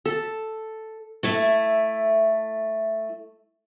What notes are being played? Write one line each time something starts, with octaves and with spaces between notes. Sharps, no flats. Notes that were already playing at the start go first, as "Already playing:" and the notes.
A4
A3 E4 E5